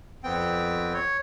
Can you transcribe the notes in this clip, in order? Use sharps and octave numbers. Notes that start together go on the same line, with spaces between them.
F2 B3 C4 G5
C#5